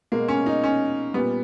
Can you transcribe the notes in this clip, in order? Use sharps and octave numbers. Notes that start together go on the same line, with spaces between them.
B2 G#3 A#3
C#4
D#4
C#4
A#2 G3 B3